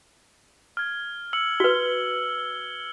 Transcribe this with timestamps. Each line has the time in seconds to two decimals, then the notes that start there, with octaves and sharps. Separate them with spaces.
0.77 F6 G#6
1.33 E6 C#7 F#7
1.60 F#4 B4 G7